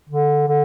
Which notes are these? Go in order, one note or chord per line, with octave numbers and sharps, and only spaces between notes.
D3
D3